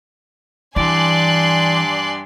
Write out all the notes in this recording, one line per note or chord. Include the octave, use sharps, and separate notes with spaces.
G2 E3 D5 G#5 C6 F#6